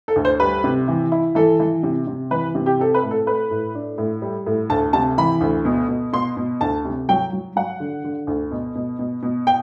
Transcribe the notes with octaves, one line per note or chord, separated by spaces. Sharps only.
A4
D2
C5
G3 B4
C3
E3
E4
E3 A4
E3
C3
C3
E3 B4
C3
G4
C4 A4
B4
A2
A4
A3 B4
A2
D4
A2
G3
A2
D2 A5
C3 A5
E3 B5
D2
B2
B2
B2 C6
B2
D2 A5
C3
F#3 G5
F#3
F#3 F#5
D3
D3
D2
B2
B2
B2
B2
G5